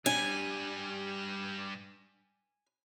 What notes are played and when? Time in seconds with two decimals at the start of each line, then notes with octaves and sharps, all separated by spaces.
0.06 G2 G3 D4 G#5